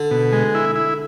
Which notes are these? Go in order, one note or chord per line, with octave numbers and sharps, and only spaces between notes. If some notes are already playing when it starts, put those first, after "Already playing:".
Already playing: D3
B2
G#3
E4
E4